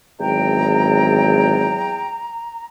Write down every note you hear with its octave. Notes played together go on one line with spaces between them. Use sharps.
G#1 E2 F#3 G5 A#5